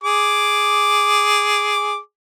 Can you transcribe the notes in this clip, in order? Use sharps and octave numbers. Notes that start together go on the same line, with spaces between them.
G#4 D6